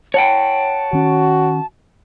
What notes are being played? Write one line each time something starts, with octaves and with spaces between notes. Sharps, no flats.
C#5 F#5 G5 A5
D#3 C#4 F#4